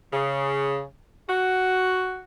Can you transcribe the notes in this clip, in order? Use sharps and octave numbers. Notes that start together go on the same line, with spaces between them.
C#3
F#4